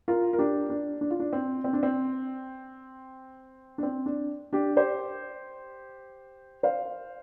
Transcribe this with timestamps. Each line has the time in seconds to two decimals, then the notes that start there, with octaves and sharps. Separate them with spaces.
0.08 F4 A#4
0.33 A#4
0.38 D4 G4
0.70 D4
1.01 D4
1.11 F4
1.20 D4
1.33 C4
1.64 C4
1.73 D4
1.83 C4
3.78 D4
3.83 C4
4.06 D4
4.53 D4 G4
4.76 G4 C5
6.63 C5 F5